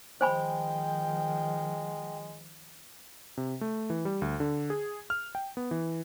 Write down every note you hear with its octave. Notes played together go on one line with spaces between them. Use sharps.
D#3 F3 G#3 C5 G5 G#5 B5
C3
A3
E3
G3
D2
D3
G#4
F6
G5
B3
E3